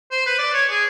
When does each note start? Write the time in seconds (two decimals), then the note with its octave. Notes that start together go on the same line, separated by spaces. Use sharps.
0.11 C5
0.26 B4
0.38 D5
0.54 C#5
0.70 G#4